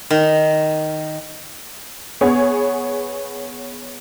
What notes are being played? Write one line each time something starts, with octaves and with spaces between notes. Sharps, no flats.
D#3
B3 G#4 C#5